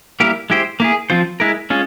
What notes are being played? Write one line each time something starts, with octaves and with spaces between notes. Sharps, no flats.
G3 A#3 E4 G4 A#4
G#3 E4 G4 C5
A#3 E4 G#4
F3 C4 F4 C5
G#3 E4 A#4
G#3 C#4 F4